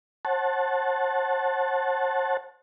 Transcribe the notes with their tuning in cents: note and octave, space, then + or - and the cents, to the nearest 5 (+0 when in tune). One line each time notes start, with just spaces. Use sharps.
C5 +45 F#5 +0 A5 +0